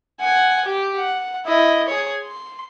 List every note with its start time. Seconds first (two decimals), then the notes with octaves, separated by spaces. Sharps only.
0.20 F#5 G#5
0.65 G4
0.97 F#5
1.46 E4 D#5
1.88 G#4 C#5
2.23 C6